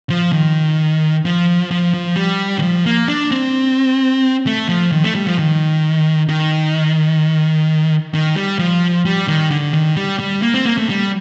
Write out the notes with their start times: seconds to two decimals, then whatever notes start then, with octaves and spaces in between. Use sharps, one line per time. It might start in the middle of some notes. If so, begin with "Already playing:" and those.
0.10 F3
0.32 D#3
1.25 F3
1.71 F3
1.94 F3
2.16 G3
2.59 D#3
2.62 F3
2.86 A#3
3.08 D4
3.31 C4
4.47 A3
4.69 F3
4.92 D#3
5.04 A3
5.15 G3
5.27 F3
5.39 D#3
6.29 D#3
8.14 D#3
8.36 G3
8.59 F3
9.05 G3
9.28 D#3
9.51 D3
9.73 D#3
9.96 G3
10.19 G3
10.42 A#3
10.54 C4
10.65 A#3
10.78 A3
10.89 G3